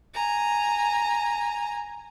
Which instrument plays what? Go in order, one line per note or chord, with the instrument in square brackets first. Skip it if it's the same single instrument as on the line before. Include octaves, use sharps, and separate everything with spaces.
[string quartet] G#5 A#5